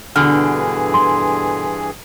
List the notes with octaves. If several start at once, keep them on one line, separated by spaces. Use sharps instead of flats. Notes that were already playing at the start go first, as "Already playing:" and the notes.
G2 B2 D3 E3 G#4 F6
C6